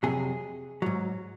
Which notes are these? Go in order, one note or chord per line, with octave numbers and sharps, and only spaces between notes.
F2 C3 F#3 G#4
G#2 F#3